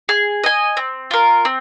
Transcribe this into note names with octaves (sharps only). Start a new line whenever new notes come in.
G#4
D#5 G#5
C4
F4 A#4
C4